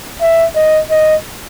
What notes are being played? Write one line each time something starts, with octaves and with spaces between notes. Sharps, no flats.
E5
D#5
D#5